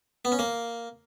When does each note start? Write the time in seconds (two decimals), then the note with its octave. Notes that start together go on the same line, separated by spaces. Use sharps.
0.25 B3
0.32 C#4
0.39 A#3